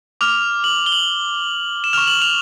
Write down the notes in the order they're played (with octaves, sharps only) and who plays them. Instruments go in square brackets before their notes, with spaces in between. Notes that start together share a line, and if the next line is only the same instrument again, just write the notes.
[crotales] D6 F6 F7
F#7
G7
F#7
E7
C#6 F6 F7
F#7
F7